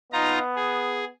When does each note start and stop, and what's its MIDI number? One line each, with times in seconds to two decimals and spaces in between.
0.13 1.09 59
0.13 0.39 63
0.13 0.39 65
0.13 0.39 82
0.56 1.04 68